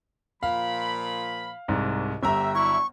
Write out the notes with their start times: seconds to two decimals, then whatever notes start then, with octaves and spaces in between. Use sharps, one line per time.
0.43 A#2 F3 F5 B5
1.68 C2 G#2
2.23 G1 G4 E5 A#5
2.55 F#3 D4 E4 C#6